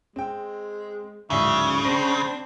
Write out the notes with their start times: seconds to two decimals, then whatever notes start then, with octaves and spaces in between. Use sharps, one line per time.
0.16 G#3 C4 G5
1.30 D1 G#2 C#3 D5 E5
1.85 C4 D4 C5 A#6